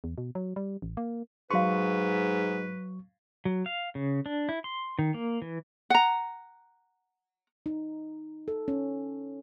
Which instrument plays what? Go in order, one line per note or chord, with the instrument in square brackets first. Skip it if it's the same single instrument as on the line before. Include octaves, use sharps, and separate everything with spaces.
[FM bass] E2
B2
F#3
G3
A1
A#3
[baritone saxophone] G#2 [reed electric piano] F#3 C#6 [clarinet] B4 [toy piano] F5 C6
[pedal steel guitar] F#3
F5
C#3
D4
E4
C6
D#3
A#3
E3
[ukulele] F#5 A#5
[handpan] D#4
A4
C#4